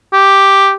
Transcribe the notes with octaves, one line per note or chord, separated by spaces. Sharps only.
G4